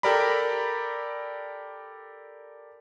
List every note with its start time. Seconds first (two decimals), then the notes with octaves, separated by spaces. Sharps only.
0.03 G4 A4 A#4 D5 A#5 B5